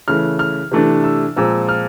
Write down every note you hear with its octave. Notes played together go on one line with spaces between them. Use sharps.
C#3 E3 A3 F6
F6
C3 E3 A3 D4
E6
A#2 F3 G#3 C4 E6
F6